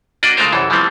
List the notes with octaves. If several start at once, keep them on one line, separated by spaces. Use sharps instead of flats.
A#3 D4 F#4 D5 D#5
C#3 G#3 A3 F4 A#4 C5
C2 F#2 E3 A4
E3 F3 G3 A3 B3 C4